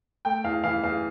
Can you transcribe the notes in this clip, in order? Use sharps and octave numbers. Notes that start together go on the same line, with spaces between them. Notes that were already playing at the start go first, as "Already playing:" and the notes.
A3 G5
E2 F5
E3 F5
E2 F5